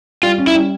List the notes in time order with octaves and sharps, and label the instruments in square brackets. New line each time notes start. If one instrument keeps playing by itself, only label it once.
[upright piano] G3 [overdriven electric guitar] F4
[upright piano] C#4
[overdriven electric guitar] E4
[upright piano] G3